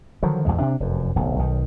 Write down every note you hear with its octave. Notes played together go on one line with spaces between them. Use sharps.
D3 D#3 F3 F#3
A1 E2 G#2 G#3
C3 D4
F1 F#2
D1 B1
B1 D#3